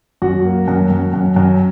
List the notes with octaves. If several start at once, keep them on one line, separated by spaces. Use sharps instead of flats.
F#2 F#4
A#3
F#2
F#2
F#2
F#2